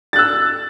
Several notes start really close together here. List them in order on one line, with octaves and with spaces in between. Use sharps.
A6 F#6 E6